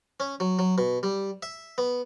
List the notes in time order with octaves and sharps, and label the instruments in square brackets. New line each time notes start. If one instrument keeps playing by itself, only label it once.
[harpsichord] C#4
F#3
F#3
B2
G3
E5
B3